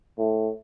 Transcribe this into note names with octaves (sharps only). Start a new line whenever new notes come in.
A2